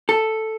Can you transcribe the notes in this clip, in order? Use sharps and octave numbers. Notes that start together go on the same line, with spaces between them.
A4